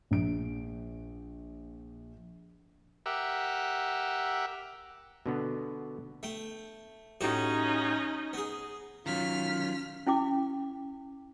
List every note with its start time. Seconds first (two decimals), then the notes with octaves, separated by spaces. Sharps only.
0.11 A#1 D7
3.06 G4 A#4 E5 F#5
5.26 B2 D3 B3
6.23 A3 G5
7.21 A2 C#4 D#4 F#4 G4
8.33 B3 G#4
9.06 D#3 F#3 C#4 F4 F6 B6
10.07 C#4 E4 G5 D6